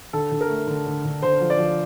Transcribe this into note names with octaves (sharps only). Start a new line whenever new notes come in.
D3 A4
D3
A#4
A3
D3
D3
D3
D3 C5
F3
D5
F3